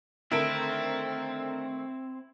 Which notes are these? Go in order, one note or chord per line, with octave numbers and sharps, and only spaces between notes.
D3 D#3 A3 C4 E4 A#4 E5 D7